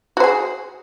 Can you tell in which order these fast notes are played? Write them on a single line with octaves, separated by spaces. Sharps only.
F#4 C5 G#4